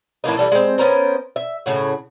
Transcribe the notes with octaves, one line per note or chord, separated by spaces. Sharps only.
A2 E3 A#3 D#4
E3 G3 A4
G#3 C4
B3 C#4 A#4 C5
E5
A2 C#3 F#4